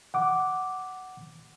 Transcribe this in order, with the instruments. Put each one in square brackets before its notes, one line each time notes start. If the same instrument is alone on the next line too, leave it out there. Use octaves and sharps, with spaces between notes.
[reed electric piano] F#5 D6